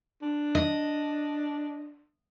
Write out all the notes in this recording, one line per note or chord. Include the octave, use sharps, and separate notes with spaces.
D4
D#5